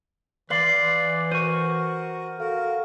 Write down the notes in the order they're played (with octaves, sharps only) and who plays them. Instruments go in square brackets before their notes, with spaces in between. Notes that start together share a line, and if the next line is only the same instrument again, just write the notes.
[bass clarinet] E3 [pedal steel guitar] B4 F5 C6 [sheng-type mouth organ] D5 [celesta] A6 C7 F#7
[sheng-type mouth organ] F#4 A#4 [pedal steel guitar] C5 C#6 [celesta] D#7
[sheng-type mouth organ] F#4 A#4 [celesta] A4 F5